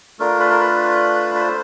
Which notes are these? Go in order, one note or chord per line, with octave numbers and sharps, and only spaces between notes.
A3 D4 F4 A#4
B4
A#4
B4
B4
C5